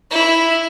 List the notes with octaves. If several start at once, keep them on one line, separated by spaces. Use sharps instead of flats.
E4